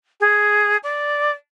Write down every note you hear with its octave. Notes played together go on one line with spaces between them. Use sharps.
G#4
D5